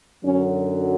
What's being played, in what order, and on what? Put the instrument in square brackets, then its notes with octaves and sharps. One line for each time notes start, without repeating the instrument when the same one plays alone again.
[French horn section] F#2 D3 F#3 C#4